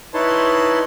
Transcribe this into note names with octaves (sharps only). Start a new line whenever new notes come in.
D#4 E4 B4 C#5 A5 C6